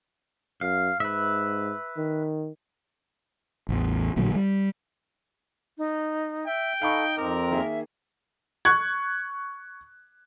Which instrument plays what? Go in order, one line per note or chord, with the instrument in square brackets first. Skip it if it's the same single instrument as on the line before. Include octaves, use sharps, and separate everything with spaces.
[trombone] F#2 [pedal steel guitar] F5
[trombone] G#2 [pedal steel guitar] B4 E5
[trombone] D#3
[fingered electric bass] A1 E2
A1 A#2 D3 F#3
G3
[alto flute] D#4
[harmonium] E5 [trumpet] G5
[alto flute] D#4 [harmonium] A4 [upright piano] F5 B5 C#6
[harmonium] F2 C4 [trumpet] A#4 [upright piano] D6
[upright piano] D#3 A#3 G#4 [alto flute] E5
[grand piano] C#6 F#6 G#6